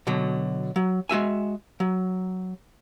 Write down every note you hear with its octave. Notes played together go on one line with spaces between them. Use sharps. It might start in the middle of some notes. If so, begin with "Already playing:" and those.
B2 D3 F#3
F#3
G#3 F#4 E5 G#5
F#3